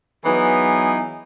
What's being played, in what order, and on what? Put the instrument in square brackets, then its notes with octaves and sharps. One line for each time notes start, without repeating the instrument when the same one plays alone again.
[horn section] E3 F#3 B3 D#4 G#4